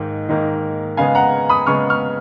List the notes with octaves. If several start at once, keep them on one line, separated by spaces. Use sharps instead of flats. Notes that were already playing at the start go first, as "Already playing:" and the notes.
Already playing: G#2 D#3 A#3
G#2 D#3 A#3
C#3 G#3 B3 F5 G#5
F#5 A#5
B5 D#6
C#3 G#3 B3 C#6 F6
C#6 F6